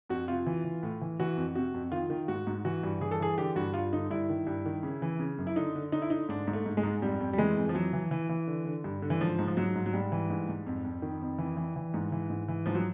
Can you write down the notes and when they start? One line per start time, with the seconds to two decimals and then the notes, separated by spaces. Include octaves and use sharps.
0.09 F2 F#4
0.28 C3 F4
0.46 E3
0.65 E3
0.83 A2
1.01 E3
1.20 E3 F#4
1.37 F2
1.55 C3 F#4
1.74 F2
1.92 D#3 F4
2.10 D#3
2.28 G#2 F#4
2.47 G#2
2.65 E3 F#4
2.83 G2
3.01 E3 G#4
3.11 A4
3.20 E3 G#4
3.38 D3 G4
3.56 G2 F#4
3.74 G2 F4
3.92 D3 D#4
4.10 G2 E4
4.29 D#3
4.47 G2
4.66 D#3
4.83 C#3
5.02 E3
5.19 C#3
5.38 F#2
5.47 E4
5.56 D3 D#4
5.75 D3
5.92 D3 D#4
6.02 E4
6.10 D3 D#4
6.29 G#2 D4
6.47 G#2
6.53 A3
6.66 G#2
6.77 G#3
6.83 G#2
7.02 F2 G3
7.21 F2
7.33 G3
7.38 E3 G#3
7.57 F2
7.69 F3
7.74 E3 F#3
7.93 E3
8.11 E3
8.29 E3
8.47 D3
8.65 D3
8.84 G2
9.02 D3
9.10 E3
9.21 G#2 F3
9.39 G#2
9.48 F3
9.57 G#2 F#3
9.75 G#2
9.86 F#3
9.93 G#2 G3
10.12 E3
10.30 G#2
10.49 G#2
10.66 F2
10.85 F2
11.02 D#3
11.21 F2
11.38 E3
11.57 E3
11.76 E3
11.94 G#2
12.12 E3
12.30 G#2
12.48 E3
12.66 G#2 F3
12.75 F#3